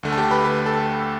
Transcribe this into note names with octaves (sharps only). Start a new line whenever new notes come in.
D2 D3 A3
A5
G4 G5
B4 B5
B4 B5
A4 A5